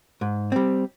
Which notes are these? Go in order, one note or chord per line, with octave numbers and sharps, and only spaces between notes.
G#2
G3 C4